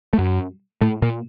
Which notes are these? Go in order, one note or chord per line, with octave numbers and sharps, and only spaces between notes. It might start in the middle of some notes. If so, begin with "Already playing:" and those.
A3
F#2 F#3
A2 A3
A#2 A#3